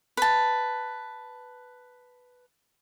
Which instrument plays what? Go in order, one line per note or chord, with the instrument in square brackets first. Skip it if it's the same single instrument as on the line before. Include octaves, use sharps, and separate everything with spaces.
[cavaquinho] B4 A5